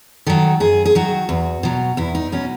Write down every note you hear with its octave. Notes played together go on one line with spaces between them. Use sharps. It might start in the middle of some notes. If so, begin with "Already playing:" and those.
D#3 F#3 A4
F#2 G#4
G#4
D#3 F#3 F#4
E2
B2 F#3
E2 E4
D#4
B2 F#3 C#4